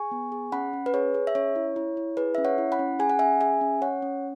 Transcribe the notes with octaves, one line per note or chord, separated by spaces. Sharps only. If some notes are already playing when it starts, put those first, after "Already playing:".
Already playing: G#4 G#5 C#6
B3
G#4
C#4 F#5 B5
C#4
B4
G#4 C#5
G#4
E5
C#4 C#5
E4
E4
E4
G#4 B4
C#4 E5
C#5 F#5
E4
F#5 B5
C#4
G#4 G#5
F#5
C#4 E5 G#5
G#4 E5 G#5
C#4
C#4 C#5 F#5
C#4